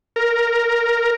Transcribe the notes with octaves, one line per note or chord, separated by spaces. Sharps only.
A#4